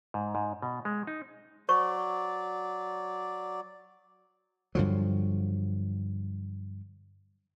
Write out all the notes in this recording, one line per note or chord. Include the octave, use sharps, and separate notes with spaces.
G#2
G#2
B2
G#3
D#4
F#3 C5 D5 C#6
G2 D3 F3 F#3